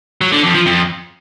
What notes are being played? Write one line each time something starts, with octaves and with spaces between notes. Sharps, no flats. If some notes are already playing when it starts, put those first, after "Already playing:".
F#3
D3
F2
F3
F2